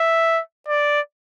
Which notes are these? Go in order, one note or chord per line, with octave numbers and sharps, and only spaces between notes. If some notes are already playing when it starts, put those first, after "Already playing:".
Already playing: E5
D5